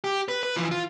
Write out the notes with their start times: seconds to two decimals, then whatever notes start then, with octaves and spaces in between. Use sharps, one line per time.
0.04 G4
0.28 B4
0.43 B4
0.57 E3 F3
0.71 F4